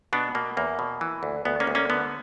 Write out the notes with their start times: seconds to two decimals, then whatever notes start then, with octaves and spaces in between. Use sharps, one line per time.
0.13 B2 B3 D4
0.35 B2 A#3
0.57 E2 A#3
0.79 B2
1.01 E3
1.23 D2
1.45 D2 B3
1.60 A#3 C#4
1.67 D2
1.75 A#3 C#4
1.90 D3 B3